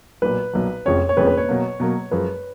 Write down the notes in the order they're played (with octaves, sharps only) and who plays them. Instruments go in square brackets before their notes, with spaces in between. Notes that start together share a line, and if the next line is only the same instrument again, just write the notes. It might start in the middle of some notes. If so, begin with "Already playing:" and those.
[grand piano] B1 A#2 F#3 [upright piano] B4
[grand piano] B1 A#2 F#3
[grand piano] F1 F2 F3 G#3 C#4 [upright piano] C#5
[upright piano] C#5
[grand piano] F1 F2 F3 G#3 C#4 [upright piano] B4
[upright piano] B4
C#5
[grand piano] B2 F#3 A#3
B2 F#3 A#3
[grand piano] F#2 F3 G#3 [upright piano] B4